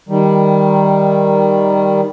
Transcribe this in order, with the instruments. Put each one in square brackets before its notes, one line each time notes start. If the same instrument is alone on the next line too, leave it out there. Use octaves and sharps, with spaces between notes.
[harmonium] D#3 G3